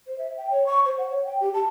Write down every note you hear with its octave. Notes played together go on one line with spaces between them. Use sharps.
C5
E5
G5
C#5
C#6
C5
F#5
C#5
G5
G4
A5